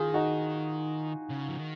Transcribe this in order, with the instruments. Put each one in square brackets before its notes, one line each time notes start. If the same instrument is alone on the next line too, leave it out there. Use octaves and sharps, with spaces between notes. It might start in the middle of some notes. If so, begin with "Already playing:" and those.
Already playing: [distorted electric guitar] D#3 [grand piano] F4 G#4
[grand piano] D#4 F#4
[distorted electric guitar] C#3
F3
D#3